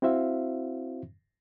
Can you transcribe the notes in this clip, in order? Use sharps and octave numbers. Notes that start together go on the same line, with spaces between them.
C4 E4 F#4 C5 E5 F5